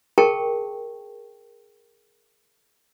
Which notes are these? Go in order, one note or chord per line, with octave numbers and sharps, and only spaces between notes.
G#4 A#4 G5 A5 C#6